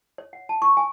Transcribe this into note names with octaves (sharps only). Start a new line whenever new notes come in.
C#5
F#5
A5
C#6
G#5